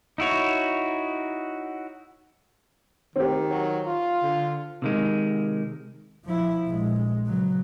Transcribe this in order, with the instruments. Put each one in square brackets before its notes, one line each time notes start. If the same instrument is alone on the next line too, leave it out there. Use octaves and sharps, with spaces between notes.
[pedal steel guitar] D#4 E4 F#4 C#5
[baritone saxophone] D#3 [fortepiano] C4 G4
[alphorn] F#3
F4
[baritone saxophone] D3
[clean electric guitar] C3 D#3 G#3
[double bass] F3 E4
A#1 G#3
C#3 F#3